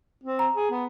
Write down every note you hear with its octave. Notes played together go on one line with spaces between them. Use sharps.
C4
A#5
G#4
B3